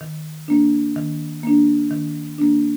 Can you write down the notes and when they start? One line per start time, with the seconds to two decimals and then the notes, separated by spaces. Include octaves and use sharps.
0.01 D#3
0.48 A#3 D4
0.96 D#3
1.43 A#3 D4
1.91 D#3
2.38 A#3 D4